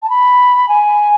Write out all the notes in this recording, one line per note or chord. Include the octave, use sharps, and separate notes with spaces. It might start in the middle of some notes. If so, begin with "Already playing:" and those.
A5
B5
G#5